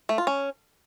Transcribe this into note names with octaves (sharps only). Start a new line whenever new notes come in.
A3
F4
C#4